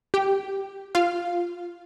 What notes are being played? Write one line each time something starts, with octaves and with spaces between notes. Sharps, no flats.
G4 G5
F4 F5